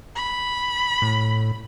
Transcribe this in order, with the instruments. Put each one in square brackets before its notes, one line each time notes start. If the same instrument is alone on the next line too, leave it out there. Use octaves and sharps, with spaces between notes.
[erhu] B5
[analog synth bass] A2